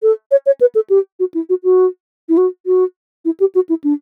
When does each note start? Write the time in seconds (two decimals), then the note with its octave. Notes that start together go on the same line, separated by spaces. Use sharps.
0.03 A4
0.31 C#5
0.46 C#5
0.61 B4
0.75 A4
0.90 G4
1.20 F#4
1.34 E4
1.49 F#4
1.64 F#4
2.29 E4
2.37 F#4
2.66 F#4
3.25 E4
3.40 G4
3.55 F#4
3.69 E4
3.84 D4